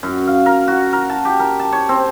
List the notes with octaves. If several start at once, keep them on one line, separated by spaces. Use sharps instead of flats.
F#2
F5
A#4
F#4
A#4
A5
G4
A#4
A5
C#5
C4